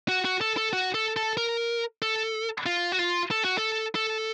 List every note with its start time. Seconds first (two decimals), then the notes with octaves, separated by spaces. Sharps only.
0.09 F#4
0.25 F#4
0.41 A4
0.57 A4
0.73 F#4
0.94 A4
1.16 A4
1.37 A#4
2.02 A4
2.66 F4
2.92 F#4
2.99 F4
3.31 A4
3.45 F#4
3.58 A4
3.95 A4